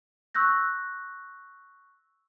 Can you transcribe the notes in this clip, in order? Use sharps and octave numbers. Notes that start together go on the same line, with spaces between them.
C#6 E6 F#6 G6 A#6